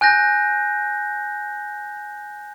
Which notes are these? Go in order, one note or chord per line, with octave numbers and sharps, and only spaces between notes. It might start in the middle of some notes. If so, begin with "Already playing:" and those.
G#5 F#6 G6 A#6